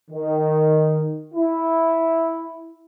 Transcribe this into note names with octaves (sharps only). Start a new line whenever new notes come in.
D#3
E4